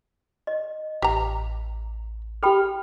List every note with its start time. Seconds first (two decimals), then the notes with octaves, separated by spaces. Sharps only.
0.47 D#5
1.02 A1 G4 A#5
2.43 G4 A4 G5 B5 F6